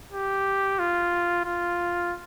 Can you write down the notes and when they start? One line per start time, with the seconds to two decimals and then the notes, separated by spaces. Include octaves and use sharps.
0.13 G4
0.79 F4
1.45 F4